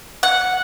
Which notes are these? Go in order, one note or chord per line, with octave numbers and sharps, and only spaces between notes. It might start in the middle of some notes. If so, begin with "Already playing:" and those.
F#5